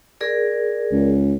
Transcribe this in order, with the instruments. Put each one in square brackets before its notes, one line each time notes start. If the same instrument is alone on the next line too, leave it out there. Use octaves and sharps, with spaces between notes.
[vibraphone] G#4 A#4 D5
[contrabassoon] C#2